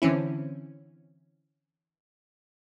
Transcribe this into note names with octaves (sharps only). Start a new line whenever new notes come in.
D3 E3 C4 C#4 E4